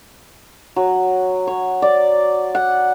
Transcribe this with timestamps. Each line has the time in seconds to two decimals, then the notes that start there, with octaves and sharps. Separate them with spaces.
0.76 F#3
1.47 C#5
1.82 D5
2.55 F#5